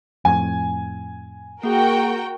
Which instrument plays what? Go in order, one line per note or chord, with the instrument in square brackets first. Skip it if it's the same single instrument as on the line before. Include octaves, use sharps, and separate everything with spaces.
[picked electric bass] F2 A2 [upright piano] G#5
[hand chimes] A#3 G#4 [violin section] F#4 A#4 G5